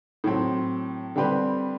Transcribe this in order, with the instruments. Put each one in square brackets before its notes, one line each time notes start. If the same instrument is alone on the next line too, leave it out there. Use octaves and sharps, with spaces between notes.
[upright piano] A2 F#3 C4
D3 G3 C4 G4 B4